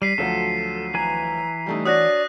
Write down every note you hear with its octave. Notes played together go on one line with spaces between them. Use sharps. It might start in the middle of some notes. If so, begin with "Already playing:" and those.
G3 B6 C7 D#7
D2 F3 F#3 A4
E3 B4 G#5 A#5
G3 A3 D#4
D4 F#4 C#5 D5 D#6 F#6 A#6